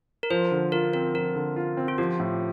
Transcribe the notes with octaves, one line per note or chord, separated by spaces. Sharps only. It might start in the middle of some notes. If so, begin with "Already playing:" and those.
A#4
F3 C5
D3
F4 A#4
C4 A#4
F3 A#4
D3
F4
C4
F4
F3 G4
A2